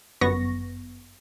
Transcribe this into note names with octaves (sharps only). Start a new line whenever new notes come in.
G1 F#2 B3 C#6 A#6